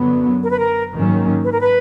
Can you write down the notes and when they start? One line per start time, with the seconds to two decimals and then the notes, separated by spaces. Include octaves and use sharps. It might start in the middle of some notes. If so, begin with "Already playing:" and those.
Already playing: F#2 D3 F#3 B3
0.43 A#4
0.51 B4
0.58 A#4
0.92 G#2 D#3 F#3 A#3 C#4
1.43 B4
1.51 A#4
1.60 B4